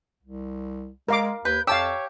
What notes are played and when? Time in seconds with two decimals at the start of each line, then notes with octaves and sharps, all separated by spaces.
0.23 C2
1.09 G#3 A#4 F5 D6
1.45 D#2 B4 G6
1.67 F2 G4 C#5 F5 A5 E6